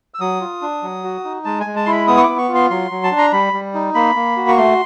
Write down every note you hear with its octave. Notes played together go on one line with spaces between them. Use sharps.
E6
F#3 D#6
F4
D4
F#3
F#4
D#4
G#3 A5
G#5
G#3
A5
E4 C6
B5
B3 D#6
C#6
B3 D6
C#6
F4
C6
F#3 C6
F#3
A5
D4
A#5
G3 B5
G3
D#4
A#3 B5
A#3
F#4
C#6
A3 C6